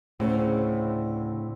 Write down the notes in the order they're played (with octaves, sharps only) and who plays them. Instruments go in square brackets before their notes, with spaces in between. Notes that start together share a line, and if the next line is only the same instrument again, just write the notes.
[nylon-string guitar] D2 C#3 [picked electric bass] A2 [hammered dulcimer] C4